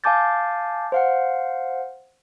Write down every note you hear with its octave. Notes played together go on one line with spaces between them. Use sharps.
F5 G#5 A5 D6 G6 A6
C5 F5 F#5